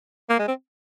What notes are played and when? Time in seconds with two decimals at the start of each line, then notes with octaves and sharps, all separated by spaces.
0.29 A#3
0.39 G#3
0.48 C4